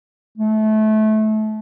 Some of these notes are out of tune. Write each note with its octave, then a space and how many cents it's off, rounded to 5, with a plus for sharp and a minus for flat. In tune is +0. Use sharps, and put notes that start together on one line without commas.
A3 -25